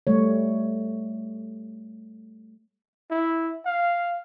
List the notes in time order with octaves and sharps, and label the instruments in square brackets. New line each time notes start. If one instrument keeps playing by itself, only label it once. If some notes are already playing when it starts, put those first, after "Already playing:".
[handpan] G3 A3 C#5
[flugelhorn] E4
F5